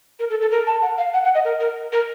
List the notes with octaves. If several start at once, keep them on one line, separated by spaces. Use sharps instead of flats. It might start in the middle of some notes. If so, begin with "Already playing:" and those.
A#4
A4
A4
A#4
A5
F#5
F5
F#5
F#5
D#5
A#4
A#4
A#4